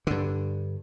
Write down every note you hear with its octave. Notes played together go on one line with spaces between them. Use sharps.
G2 D3